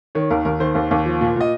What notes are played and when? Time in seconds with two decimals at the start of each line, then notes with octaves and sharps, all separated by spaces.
0.15 D#3 C#5
0.30 D#2 A#4
0.45 D#2 A#4
0.60 D#3 C5
0.75 D#2
0.91 D#2
1.06 F3
1.21 A#2
1.36 A#2 D#5